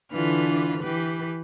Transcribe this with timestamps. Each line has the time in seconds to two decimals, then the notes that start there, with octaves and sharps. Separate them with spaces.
0.12 D3 E3 D4 F4 B4 F6
0.80 E3 G4 B4